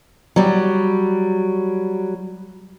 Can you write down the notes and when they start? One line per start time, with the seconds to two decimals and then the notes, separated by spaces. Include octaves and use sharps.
0.36 F#3 G3